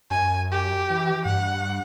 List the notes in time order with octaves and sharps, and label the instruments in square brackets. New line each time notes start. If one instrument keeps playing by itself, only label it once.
[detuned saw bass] F#2 [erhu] G#5
[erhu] G4
[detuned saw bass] E3
[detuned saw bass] G2 [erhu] F#5